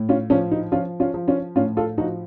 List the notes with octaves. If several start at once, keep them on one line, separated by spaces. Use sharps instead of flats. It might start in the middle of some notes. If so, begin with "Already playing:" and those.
Already playing: A2
C#4 F4
F3 C#4
D#4
F3 C#4 F4
C#4 F4
F3
C#4 F4
A2 C#4 F4
F4 A4
F3 D#4 F#4